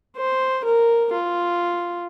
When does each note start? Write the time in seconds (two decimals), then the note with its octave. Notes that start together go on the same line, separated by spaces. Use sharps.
0.17 C5
0.65 A#4
1.13 F4